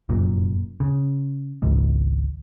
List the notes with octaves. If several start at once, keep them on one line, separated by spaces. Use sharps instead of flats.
F1 F#2 A#2
C#3
G#1 C#2 G#2